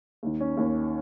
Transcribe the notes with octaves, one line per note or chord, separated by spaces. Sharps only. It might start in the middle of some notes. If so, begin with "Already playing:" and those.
D#2 D#3
C#4
D#2 D#3